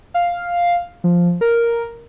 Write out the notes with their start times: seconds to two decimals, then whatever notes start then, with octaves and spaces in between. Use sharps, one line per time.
0.14 F5
1.04 F3
1.41 A#4